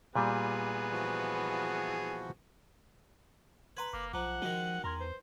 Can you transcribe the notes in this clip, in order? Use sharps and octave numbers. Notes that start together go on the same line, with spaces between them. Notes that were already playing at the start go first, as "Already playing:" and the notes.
A#2 G3 B3 G#4
E3 F3 F#4
B4 F#5 A#5 C6 G#6
F#1 A#3 D6
B1 F3 F#5 A#5 D6
D#3 F3 G#3 F#4 G7
E2 A#4 A#5 C6 G#6
B4 C5